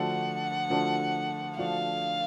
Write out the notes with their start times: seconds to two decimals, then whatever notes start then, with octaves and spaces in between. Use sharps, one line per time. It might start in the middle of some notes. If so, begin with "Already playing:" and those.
Already playing: D3 F3 A3 D4 F#4 F#5
0.70 D3 F3 A3 D4 F#4
1.58 D3 F3 A3 D4 F#4 F5